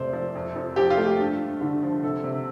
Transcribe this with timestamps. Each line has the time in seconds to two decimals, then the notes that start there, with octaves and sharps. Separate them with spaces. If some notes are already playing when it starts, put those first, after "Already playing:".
Already playing: F2 C3 A3 C5 D5
0.13 F3
0.35 F2
0.56 F2
0.76 F3 G4
0.90 F4
0.98 A3
1.05 G4
1.19 G2
1.40 G2
1.61 D3
1.83 F3
2.03 C3 A4
2.24 C3